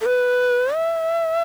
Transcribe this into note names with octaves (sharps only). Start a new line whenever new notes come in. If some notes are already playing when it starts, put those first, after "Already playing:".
A4
B4
E5